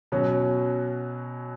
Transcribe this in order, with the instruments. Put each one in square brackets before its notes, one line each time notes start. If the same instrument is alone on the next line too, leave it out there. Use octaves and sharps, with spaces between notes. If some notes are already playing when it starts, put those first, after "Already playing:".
[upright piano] B2 F#3 C#4